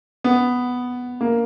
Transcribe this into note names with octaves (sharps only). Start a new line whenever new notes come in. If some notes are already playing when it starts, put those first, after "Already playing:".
B3
A#3